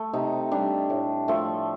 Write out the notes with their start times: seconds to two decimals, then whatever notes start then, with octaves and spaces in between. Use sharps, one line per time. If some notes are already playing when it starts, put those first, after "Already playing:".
Already playing: A3
0.13 C3 D#4
0.51 G3 D4
0.90 A2
1.28 F3 A3